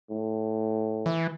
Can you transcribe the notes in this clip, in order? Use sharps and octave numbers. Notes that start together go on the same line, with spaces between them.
A2
E3